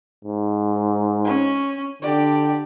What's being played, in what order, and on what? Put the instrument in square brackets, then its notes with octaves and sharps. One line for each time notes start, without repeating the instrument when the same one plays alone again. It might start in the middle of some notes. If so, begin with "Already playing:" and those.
[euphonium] G#2
[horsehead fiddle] C#4
[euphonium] D3 [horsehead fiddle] G4 D5